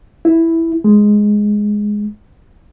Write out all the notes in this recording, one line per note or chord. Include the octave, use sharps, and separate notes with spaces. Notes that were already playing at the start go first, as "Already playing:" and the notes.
E4
G#3